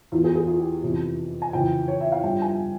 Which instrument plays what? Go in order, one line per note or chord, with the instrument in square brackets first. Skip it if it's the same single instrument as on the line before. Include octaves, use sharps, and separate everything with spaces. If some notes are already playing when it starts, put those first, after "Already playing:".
[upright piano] E2 E3 F4
G#4
G#4
F4
G4
F2 C3 E3
G#5
F2 C#3 E3 G5
C#5
E5
F5
G2 F3 G5
G#5